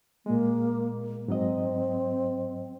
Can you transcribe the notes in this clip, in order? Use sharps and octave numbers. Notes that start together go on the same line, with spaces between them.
A#2 G#3 A#3
G#2 F#3 C4 D#5